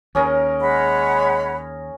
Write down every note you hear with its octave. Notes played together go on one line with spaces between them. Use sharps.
D#2 C#4 G#4 A#4
G#3 C#5 F#5 B5